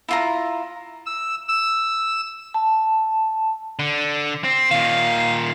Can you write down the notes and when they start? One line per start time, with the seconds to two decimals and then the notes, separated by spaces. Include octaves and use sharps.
0.08 E4 F4 A#5
1.06 E6
1.48 E6
2.54 A5
3.79 D3
4.44 C4
4.71 A#2 D#3 F5